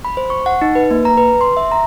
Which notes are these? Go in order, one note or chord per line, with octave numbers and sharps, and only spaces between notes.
B5
C5
C#6
F#5
D#4
B4
A#3
A#5
B4
C6
E5
A#5